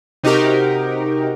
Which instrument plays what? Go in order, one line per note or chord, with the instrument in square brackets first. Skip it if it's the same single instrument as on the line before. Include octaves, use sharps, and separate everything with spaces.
[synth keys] C3 D#4 F#4 G4 A#4